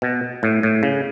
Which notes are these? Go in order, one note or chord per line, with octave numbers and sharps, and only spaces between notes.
B2
A2
A2
C#3